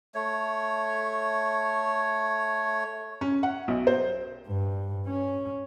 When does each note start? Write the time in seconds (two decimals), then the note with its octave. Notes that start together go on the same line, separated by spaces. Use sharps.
0.15 A3 C#5
3.21 C#4
3.43 F#5
3.68 B1
3.87 C5
4.48 G2
5.07 C#4